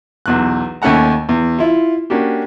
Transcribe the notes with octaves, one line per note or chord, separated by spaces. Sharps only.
B1 E2 F#6
D#2 A3 C#4 A4 F#5 A#5
E2
E4 F4
A#3 C#4 D4 F#4 G4